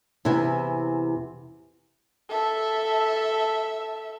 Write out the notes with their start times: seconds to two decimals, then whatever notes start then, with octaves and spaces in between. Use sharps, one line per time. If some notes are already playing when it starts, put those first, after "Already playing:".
0.25 E2 C3 B3 E4 G#5
2.30 A4 E5